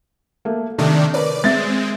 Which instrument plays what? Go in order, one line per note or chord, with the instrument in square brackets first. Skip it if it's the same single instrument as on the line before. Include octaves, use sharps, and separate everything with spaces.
[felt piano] A3 A#3
[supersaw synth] C3 D#3 D4 [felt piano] A3
[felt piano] A#4 B4 C#5 [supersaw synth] D5
[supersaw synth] G#3 C4 [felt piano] E5 A6